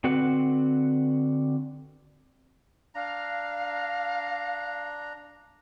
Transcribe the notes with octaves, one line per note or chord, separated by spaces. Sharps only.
D3 C4 F#4 B4 F#5
D4 F5 A#5